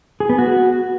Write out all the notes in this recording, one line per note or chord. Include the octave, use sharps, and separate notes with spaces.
G#4
B3
F#4